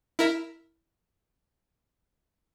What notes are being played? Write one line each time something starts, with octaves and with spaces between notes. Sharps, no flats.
E4 A#4 E5